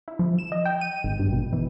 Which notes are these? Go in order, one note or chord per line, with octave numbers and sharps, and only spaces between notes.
E4
F3
E7
D#5
G5
D#7
G#1
G2
B2
E3